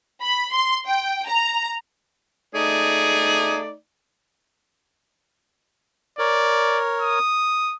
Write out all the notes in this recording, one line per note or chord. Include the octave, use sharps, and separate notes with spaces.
B5
C6
G5
A#5
A3 D#4 G#4 D5
A#4 C#5 D5
D#6